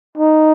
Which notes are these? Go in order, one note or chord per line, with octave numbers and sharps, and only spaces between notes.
D#4